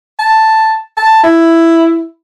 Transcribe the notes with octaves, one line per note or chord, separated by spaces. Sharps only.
A5
A5
E4